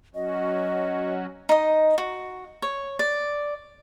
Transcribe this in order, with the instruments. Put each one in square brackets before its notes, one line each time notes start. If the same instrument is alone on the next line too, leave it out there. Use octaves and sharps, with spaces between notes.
[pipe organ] F#3 C#4 F#4 [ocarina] D#5
[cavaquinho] D#4 D#5
F#4
C#5
D5